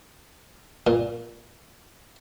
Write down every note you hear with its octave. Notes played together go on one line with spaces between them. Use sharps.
A#2